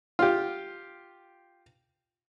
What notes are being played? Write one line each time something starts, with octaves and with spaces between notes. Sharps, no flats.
F4 G4